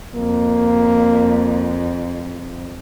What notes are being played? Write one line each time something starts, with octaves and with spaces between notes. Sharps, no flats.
F2 A#3